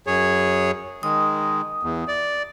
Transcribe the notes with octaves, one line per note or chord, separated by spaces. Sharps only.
F#2 G#4 C#5
D#3 G#3 D#6
E2
D5